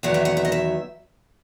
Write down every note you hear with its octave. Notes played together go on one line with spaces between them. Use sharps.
E2 D#3 F#3 B3 F#5
E5
F#5
E5
D#5
E5